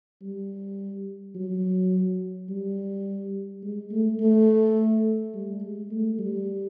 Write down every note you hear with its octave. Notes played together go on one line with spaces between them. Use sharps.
G3
F#3
G3
G#3
A3
A3
G3
G#3
A3
G3